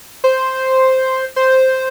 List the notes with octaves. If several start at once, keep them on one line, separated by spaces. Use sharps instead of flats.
C5
C5